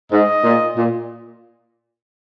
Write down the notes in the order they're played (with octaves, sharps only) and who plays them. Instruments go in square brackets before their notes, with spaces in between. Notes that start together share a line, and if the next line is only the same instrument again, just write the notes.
[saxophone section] G#2 [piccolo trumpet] D#5
[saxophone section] A#2
A#2